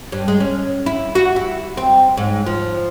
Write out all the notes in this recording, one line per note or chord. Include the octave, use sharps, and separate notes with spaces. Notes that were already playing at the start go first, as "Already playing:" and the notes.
G2
G#3
C#4
E4
F#4
E4
C4
G#2
F3